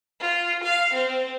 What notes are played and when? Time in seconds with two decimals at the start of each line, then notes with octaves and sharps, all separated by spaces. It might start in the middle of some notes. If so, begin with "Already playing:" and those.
0.20 F4
0.64 F5
0.93 C4